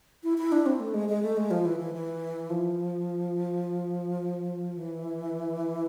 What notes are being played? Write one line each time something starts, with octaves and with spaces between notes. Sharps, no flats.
E4
E4
D4
C4
A3
G#3
G#3
A3
G#3
F3
E3
E3
E3
F3
E3